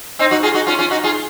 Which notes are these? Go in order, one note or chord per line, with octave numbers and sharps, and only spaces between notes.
C4 D#4
D#4 F#4
F4 G#4
D#4 F#4
C#4 F4
C#4 F4
D#4 F#4
F4 G#4